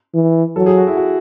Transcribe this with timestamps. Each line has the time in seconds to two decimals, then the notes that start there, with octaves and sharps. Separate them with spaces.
0.14 E3
0.56 F#3 A4
0.66 G#4
0.77 F#4
0.87 E4
0.97 F#4